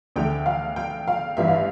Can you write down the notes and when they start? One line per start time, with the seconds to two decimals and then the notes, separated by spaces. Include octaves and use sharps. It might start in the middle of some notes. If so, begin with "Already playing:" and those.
0.16 D2 D3 G5
0.46 F5
0.76 G5
1.08 F5
1.37 A1 G2 E3 E5
1.48 F5